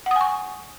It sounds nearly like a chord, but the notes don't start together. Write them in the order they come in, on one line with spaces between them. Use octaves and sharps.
F#5 D#6 G#5 C#6